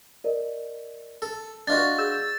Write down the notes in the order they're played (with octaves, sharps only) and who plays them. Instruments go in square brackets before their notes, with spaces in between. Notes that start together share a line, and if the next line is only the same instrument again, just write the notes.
[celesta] A#4 D5 D#5
[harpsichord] A4
[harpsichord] D4 F4 F#4 [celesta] B4 D#5 A5 [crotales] A6
[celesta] G#4 G6 [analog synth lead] E6